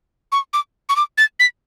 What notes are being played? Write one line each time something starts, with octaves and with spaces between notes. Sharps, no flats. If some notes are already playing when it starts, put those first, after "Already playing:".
C#6
D6
C#6
D6
A6
B6